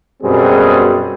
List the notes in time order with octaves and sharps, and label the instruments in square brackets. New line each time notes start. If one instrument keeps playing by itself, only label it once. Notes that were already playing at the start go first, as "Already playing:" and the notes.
[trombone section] F#2 B2 G3 C4 G#4